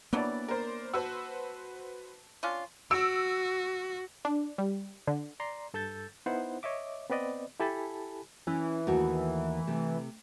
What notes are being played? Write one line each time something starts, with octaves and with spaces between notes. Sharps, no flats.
E3 F#3 G3 A#3 B3 D4 D5
A#4 C5
F#4 B4 C5 A5 E6
C#4 D4 F4
F#4 E6 D7
D4
G3
D3
D5 A#5 C6
G2 A4 E6 G6 A6
B3 D#4 E4 C5 F#5
C#5 D#5 E5 D6
B3 C4 B4 D5 D#5
E4 G4 A4 G#5 A5 B5
E3 C#4
D#2 A3 F#4
C3 A3